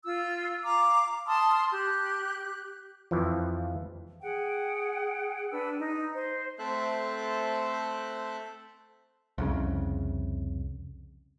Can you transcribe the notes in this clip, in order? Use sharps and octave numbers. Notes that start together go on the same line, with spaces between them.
F4 E6
F5 A#5 D6
A5 C6 D#6 F6
G4 F#6
F2 E3 F3
G#4 F#5 G5
D4 B4 E6
D#4
C5
A3 C4 A4 C5 E5 F#6
C2 F2 C#3